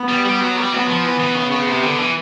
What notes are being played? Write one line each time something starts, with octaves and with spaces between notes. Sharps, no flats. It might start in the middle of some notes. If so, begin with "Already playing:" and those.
Already playing: B3
G3
G3
F#3
G3
F#3 B3
F3
E3
E3
C#3
C#3
C3
D3
E3